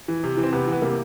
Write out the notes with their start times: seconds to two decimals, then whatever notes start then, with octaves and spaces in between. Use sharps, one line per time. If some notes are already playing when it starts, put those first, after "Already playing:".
0.08 E3
0.24 C3
0.37 E3
0.43 C4
0.52 C3 B3
0.67 E3
0.72 B3
0.82 C3 A#3